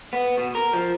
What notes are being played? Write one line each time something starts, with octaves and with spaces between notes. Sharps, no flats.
B3
B2
A#4
F3